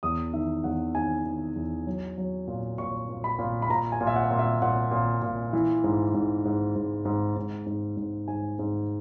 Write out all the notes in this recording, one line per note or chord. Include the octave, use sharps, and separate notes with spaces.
E2 D#6
D#3 E5
E2 F#5
D#3 G#5
D#3
E2
F#3
F#3
A#2
A#2 C#6
A#2
B5
A#2
B5
A#2 A#5
G#5
A#2
E5
F#5
A#2
E5
A#2 F#5
A#2
A#2
E3
G#2
G#2
G#2
G#2
G#2
G#2
G#2
G#2
G#2 G#5
G#2